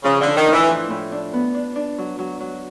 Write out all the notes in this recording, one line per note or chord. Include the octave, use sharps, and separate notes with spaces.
C#3 F3
D3
D4
D#3
A2 E3
F3
A2
D4
B3
D4
D4
F#3
F#3
F#3